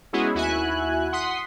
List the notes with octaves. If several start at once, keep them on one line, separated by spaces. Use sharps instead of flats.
G#3 B3 C#4 E4 F#4 G#4
D#2 E4 F#4 E5 G#5 F#6
F#5 C6 D#6 B6